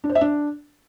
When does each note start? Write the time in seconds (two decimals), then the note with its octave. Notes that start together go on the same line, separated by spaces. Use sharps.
0.04 D4
0.10 C5
0.15 E5
0.21 D4